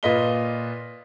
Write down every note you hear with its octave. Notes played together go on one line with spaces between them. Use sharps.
A#2 F4 B4 D#5 B6 G7